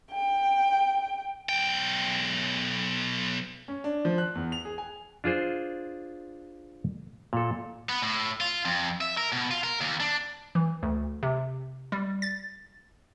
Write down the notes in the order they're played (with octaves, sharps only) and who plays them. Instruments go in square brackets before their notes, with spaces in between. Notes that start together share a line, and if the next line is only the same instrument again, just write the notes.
[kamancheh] G5
[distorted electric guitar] B1 G5
[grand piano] C#4
D4
F3
F#6
E2
F7
G#4
G#5
[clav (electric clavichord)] D4 F4 G#4 C5
A#2 A4
[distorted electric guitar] B3
A2
F4
F2
E5
A#4
B2
F4
A#4
D#2
D4
[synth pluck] E3
D2
C3
G3
A6